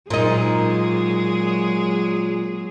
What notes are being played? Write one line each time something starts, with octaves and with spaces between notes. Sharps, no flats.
A#2 F#3 G#3 D#4 G#4